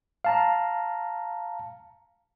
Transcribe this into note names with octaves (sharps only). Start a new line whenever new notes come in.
F5 A5 A#5